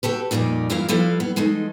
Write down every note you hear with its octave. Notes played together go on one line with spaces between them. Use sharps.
F#4 G4 A4 B4
F2 A#2 D#3 G3 D#4
G2 E3 E4 F4 A#4 F5
F3 G3 E4 A4 B4 F5
B3
E3 G#3 A3 D#4